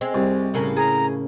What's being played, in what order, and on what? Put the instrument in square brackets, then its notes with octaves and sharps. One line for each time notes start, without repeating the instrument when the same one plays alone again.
[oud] G#3 C4
[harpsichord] C2
[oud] A2 C#3 A#3
[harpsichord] G#4 [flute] A#5